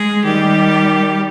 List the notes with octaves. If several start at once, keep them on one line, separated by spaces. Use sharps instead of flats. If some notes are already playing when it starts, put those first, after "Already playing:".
Already playing: G#3 G#4
D#3 G3 G4